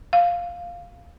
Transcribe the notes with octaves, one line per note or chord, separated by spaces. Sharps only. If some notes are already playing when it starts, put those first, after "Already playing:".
F5